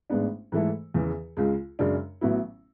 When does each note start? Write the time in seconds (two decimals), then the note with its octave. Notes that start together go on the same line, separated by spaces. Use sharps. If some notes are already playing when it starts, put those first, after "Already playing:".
0.10 A1 G#2 G#3 B3 D4
0.52 G#2 E3 A3 E4 A4
0.94 E2 C#3 E3
1.37 C#2 C#3 G#3
1.79 F#2 C#3 G#3 D4
2.21 A1 A2 F#3 B3 E4